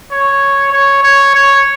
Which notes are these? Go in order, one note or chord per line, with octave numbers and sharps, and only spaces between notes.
C#5
C#5
C#5
C#5